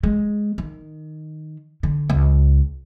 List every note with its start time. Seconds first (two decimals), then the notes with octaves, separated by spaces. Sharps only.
0.03 G#3
0.58 D#3
1.83 D3
2.10 C#2